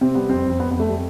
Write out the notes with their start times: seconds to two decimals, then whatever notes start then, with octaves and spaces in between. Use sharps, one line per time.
0.01 C3 C4
0.15 G3 B3
0.30 F2 C4
0.45 F2 C4
0.60 F2 B3
0.71 B3
0.74 F2
0.80 A3
0.89 G3